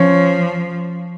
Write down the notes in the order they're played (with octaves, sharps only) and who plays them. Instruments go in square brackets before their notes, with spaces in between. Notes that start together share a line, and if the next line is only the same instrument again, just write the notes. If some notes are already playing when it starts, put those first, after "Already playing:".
Already playing: [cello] F3 [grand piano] C#4